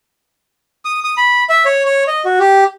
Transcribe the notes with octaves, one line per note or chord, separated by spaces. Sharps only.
D#6
D#6
B5
E5
C#5
C#5
D#5
F#4
G4